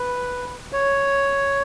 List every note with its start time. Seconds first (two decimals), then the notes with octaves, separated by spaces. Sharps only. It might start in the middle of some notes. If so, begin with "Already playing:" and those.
Already playing: B4
0.73 C#5